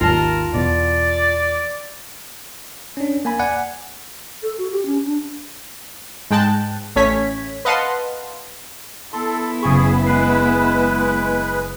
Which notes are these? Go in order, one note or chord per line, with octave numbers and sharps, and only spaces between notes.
G#1 D#2 F4 A#4 A5
E2 B2 D5
C#4 D4
A#3 G#5 B5
D5 F#5 G#5
A4
F#4
G4
C#4
D4
G#2 G#3 G5 A5 F#6
A1 A3 C#4 C#5 G#6 B6
B4 D#5 F5 F#5 A5 C6
B3 E4 A4 C6
F#1 G#4 G#5 C#6
G#3 B4 F#6 C7